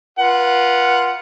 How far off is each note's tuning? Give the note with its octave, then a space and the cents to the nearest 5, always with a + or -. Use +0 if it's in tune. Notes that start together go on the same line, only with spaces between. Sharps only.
F4 -5 B4 -35 F#5 +0